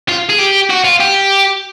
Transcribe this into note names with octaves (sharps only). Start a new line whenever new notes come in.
F4
G#4
G4
F#4
F4
G4